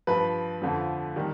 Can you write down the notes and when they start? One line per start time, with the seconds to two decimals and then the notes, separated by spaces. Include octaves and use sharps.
0.07 G2 F3 B4
0.62 F2 D3 F3
1.16 D#3 G3